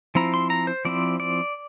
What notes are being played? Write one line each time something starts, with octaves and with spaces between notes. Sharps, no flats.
F3 C4 E4 A#5
C6
A#5
C5
F3 C4 E4 D5
D5